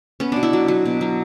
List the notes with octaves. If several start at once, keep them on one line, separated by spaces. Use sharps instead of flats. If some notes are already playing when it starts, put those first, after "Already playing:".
B3 C#4
B2 D4
E4
F#3
F#3
B2
F#3